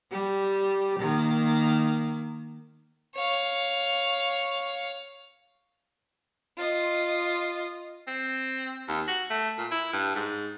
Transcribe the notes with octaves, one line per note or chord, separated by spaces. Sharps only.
G3 G4
D#3 A#3
C#5 F5
F4 D#5
C4
D#2
F#4
A3
A#2
E4
G2
G#2